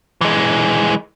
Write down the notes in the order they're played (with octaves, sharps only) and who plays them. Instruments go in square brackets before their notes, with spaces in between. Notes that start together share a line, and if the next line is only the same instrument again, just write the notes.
[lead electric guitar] E3 G#3